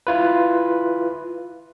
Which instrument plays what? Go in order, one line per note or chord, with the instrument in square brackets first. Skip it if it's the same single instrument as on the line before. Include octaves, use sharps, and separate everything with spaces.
[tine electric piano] E4 F4 B4